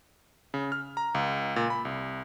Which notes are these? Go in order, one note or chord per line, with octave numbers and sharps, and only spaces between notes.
C#3
F6
A#5
C#2
A#2
B5
C2